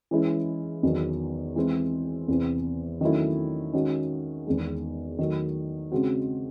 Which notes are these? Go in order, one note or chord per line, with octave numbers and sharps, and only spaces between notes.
E3 G#3 C#4 E4
E2 D#3 F#3
E3 G#3 C4
E2 C3 E3 C4
D#3 F#3 A3 C#4 E4
D#3 G#3 C#4 F#4
E2 D#3 G#3
D#3 F#3 A3
C#3 G#3 C4 F#4